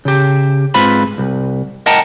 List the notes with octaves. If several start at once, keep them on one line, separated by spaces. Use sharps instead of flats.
C#3 G4
G#2 C4 F4 B4 B5
C2
A#4 D#5 F#5 G5 A5 A#5